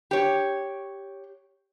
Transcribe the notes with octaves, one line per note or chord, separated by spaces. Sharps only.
G4 C#5